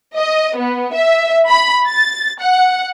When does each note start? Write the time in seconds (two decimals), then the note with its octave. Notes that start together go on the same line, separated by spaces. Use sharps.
0.16 D#5
0.56 B3
0.94 E5
1.48 B5
1.88 A6
2.42 F#5